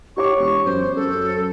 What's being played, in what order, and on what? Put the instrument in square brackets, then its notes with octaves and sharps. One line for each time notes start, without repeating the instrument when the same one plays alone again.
[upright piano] G4 C#5 D6 [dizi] C#6
[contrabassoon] E1 [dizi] C#6
[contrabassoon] F#2 [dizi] C5
[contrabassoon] F#2 [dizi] A4